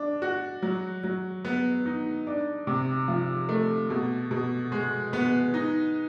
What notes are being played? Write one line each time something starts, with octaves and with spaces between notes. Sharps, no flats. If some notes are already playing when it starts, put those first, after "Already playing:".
Already playing: D4
F#4
F#3
F#3
B3
D#4
D4
C3
F3
A3
B2
B2
G#3
B3
D#4